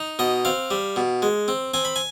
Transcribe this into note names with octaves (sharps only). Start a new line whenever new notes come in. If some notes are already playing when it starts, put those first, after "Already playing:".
Already playing: D#4
B2 D#5
C4 F5
G3
B2
G#3
C4
C4 G#5
B5
G#5